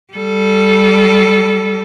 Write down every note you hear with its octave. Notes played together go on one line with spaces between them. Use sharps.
G3 A4